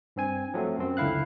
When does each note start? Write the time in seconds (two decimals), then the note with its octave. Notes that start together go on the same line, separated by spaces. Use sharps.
0.16 G2 C4 G#5
0.54 F3 F#3 A3 C4
0.79 F#2 C4
0.97 C#2 D3 E4 F5 F#6